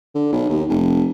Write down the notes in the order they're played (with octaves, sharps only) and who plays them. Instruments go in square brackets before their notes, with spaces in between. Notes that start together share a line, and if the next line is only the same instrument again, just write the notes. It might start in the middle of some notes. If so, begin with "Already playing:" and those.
[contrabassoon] D3
B1
D#2
F1